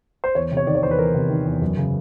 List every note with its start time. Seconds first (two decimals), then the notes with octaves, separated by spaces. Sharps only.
0.24 C5
0.35 E2 C#5
0.51 C3
0.57 C#5
0.67 D#3 D5
0.75 C#5
0.83 E2 C5
0.91 B4
0.98 E2 A#4
1.14 C3
1.30 D#3
1.46 E2
1.62 F#2
1.77 C#3